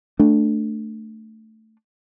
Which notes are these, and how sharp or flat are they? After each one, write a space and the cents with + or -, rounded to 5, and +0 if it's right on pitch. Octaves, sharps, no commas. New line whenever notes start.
A3 +5 D4 +5